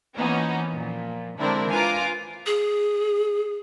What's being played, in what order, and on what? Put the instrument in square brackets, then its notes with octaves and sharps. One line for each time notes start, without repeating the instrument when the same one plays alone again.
[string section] E3 F3 A#3 B3 C#4 D#4
A#2 F3
D3 G#3 C4 D4 E4 A#4
F4 B4 F5 G#5 A#5 D6
[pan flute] G#4